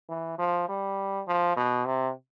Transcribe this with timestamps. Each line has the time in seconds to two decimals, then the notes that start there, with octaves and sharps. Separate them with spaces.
0.09 E3
0.38 F3
0.69 G3
1.28 F3
1.57 B2
1.86 C3